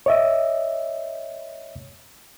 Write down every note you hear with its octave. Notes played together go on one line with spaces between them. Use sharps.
C#5 D#5 E5